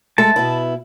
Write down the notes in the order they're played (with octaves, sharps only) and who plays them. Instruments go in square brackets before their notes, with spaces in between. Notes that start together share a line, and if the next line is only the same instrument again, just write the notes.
[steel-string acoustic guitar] G#3 A3 A4 [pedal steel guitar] A5
[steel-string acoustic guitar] B2 B3 E4